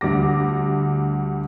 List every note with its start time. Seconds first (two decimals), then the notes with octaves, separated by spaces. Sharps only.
0.01 D2 G3 D6 A#6